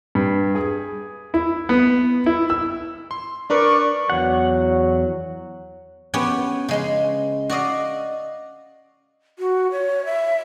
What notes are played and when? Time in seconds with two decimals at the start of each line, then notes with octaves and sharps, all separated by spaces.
0.15 G2
0.55 G#4
1.34 E4
1.69 B3
2.26 E4
2.50 E6
3.11 C6
3.50 D4 A#4 B4 D5 C#6
4.10 E2 F#3 F#5
6.14 B3 C#4 G4 C#5 F#5 G5
6.69 C#3 G#3 C6
7.50 F#4 D5 D#5 F5
9.39 F#4
9.71 C#5
10.05 E5